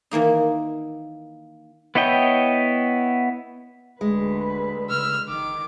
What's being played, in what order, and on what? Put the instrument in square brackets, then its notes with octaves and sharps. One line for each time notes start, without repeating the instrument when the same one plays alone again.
[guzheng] D#3 E3 A#3 D#4
[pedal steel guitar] B3 E4 C#5 D#5 G5
[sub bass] D1 [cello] D2 B4 [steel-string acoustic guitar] G#3
[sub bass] C#3 [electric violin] E6 F6
[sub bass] F#1 [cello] D#3 [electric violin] D6